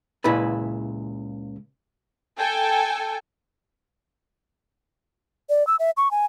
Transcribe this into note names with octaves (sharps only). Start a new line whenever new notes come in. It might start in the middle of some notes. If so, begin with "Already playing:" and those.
C#2 A#2 E4 G#4 B4
A4 G5 G#5
D5
E6
E5
C#6
G#5